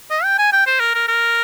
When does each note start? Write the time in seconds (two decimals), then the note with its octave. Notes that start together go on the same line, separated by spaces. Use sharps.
0.10 D#5
0.24 G5
0.38 G#5
0.52 G5
0.67 C5
0.80 A#4
0.95 A#4
1.08 A#4